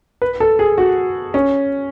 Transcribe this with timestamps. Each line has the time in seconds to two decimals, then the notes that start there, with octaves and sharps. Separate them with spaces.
0.22 B4
0.40 A4
0.59 G#4
0.78 F#4
1.34 C#4